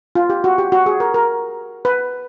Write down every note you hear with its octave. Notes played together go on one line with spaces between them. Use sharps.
F4
G4
F#4
G4
F#4
G#4
A#4
A#4
B4